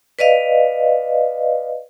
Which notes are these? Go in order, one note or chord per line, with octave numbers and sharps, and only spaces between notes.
B4 D5 D#5 F5